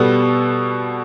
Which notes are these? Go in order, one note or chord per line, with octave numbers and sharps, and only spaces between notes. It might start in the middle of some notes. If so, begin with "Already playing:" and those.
Already playing: B2 G3 B3 A4